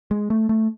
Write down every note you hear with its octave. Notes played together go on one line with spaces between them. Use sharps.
G#3
A3
A3